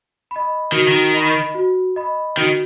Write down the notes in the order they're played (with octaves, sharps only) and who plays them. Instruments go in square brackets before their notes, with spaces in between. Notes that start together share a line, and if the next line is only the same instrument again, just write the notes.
[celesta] D#5 B5
[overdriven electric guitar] D#3 [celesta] F#4
[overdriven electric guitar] D#3
[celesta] D#5 B5
F#4
D#5 B5
[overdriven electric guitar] D#3 [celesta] F#4